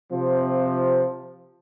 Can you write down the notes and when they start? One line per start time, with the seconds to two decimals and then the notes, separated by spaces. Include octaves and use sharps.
0.11 C3 F3